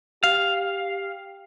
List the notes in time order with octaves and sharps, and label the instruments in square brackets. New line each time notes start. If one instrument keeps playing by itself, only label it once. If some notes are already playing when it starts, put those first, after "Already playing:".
[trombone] G4 [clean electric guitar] F5